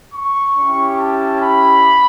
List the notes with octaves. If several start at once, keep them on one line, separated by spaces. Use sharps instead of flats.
C#6
C#4 E4 G4
A5
B5